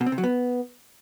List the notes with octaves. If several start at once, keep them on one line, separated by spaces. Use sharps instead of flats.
B2
C4
C3
F#3
B3